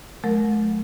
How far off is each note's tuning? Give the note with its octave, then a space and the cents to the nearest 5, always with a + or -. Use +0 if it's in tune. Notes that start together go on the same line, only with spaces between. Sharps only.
F#3 -35 A3 -45 A#4 +0